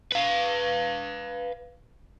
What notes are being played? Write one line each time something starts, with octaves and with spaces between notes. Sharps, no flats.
B4 F5